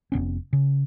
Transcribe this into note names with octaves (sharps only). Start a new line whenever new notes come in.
F1 G#2 B3 C#4
C#3